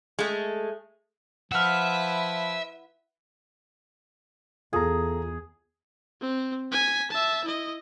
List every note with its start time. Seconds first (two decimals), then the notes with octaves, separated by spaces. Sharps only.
0.19 G#3 A3
1.52 F3 E4 B4 E5 F#5 F6
4.73 E2 F4 G#4 A4 A#5
6.21 C4
6.72 G#5 B6
7.10 E5 A5
7.44 E4 D#5